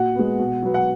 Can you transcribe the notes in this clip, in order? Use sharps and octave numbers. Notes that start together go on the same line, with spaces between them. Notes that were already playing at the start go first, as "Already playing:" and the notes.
Already playing: A#2 F#4 F#5
G#3 B3
B2
F#3 B3
F#5